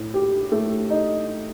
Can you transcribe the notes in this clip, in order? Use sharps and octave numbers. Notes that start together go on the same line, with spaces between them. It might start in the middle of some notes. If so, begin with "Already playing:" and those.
Already playing: A2
G4
A3
D#4